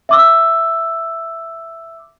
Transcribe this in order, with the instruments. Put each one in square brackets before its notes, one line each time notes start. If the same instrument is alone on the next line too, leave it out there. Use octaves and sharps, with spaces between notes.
[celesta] E5 D6 E6